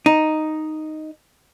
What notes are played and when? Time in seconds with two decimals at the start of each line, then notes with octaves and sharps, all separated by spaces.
0.06 D#4